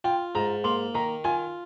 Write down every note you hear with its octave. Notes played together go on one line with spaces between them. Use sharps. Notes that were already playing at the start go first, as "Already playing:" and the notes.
F4 G5
G#2 A#5
A#3 C6
D#3 A#5
F4 G#5